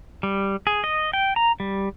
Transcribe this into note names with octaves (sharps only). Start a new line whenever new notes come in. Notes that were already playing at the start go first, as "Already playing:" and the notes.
G3
G#4
D#5
G5
A#5
G3